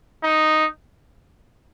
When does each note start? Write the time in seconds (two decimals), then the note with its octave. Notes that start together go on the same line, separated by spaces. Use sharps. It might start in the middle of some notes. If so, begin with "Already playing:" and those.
0.23 D#4